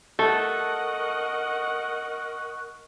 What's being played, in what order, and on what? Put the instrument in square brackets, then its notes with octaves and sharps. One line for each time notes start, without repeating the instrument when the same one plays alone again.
[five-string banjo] A3 [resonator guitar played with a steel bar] A4 [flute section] A#4 C#6 F#6 [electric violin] D#5 F#5